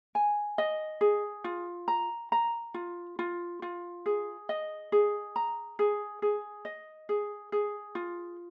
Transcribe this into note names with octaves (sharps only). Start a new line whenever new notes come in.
G#5
D#5
G#4
F4
A#5
A#5
F4
F4
F4
G#4
D#5
G#4
A#5
G#4
G#4
D#5
G#4
G#4
F4